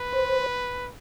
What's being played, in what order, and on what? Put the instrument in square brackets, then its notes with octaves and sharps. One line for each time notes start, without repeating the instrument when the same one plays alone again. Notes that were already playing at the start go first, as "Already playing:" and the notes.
Already playing: [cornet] B4
[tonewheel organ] C5